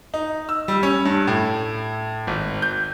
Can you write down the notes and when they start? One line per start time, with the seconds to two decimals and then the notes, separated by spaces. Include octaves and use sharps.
0.14 D#4
0.49 E6
0.68 G3
0.83 C#4
1.05 G2
1.27 A2
2.27 G#1
2.62 G6